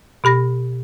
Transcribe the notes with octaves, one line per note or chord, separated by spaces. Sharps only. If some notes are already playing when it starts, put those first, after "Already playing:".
B2 G4 B5 A#6